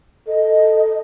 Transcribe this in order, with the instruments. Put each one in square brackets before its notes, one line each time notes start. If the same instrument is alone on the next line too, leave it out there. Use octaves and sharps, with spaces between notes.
[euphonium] A4 [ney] D#5